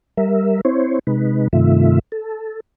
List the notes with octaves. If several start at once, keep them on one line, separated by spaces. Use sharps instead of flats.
G3 A#4 E5
C4 E4 C5 C#5
C3 G#3 D#4 B4
G2 C3 D#3 A3 F4 E5
A4